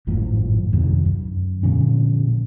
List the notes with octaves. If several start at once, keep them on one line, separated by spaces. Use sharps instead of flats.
G#1 F#2 A2 F3
F2 C3 D#3 F#3
F#2
A#2 D3 F3 C#4